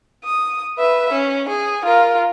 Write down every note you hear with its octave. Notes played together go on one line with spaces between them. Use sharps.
D#6
B4 E5
C#4
G#4
F4 A#4